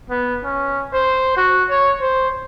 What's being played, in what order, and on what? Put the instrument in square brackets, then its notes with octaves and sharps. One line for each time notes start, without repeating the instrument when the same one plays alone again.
[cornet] B3
C#4
C5
F#4
C#5
C5